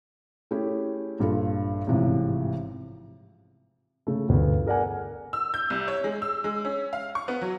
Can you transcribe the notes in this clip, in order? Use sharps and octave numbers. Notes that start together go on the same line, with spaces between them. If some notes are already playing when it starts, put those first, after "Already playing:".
A3 C#4 E4 G4 G#4
A#1 G2 F4 A4
A1 G#2 C3 E3 F3
C#3 A3
G1 D2 B3
G#4 A#4 D5 F#5 G#5
E6
G6
C2
C#5
G#3
E6
G#3
C#4
F5
C#6
B3
F#3